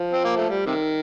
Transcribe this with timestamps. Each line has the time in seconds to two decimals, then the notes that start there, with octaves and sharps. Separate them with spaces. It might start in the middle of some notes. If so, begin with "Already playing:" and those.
Already playing: F3
0.13 C4
0.24 A#3
0.36 A3
0.49 G3
0.66 C3 D#3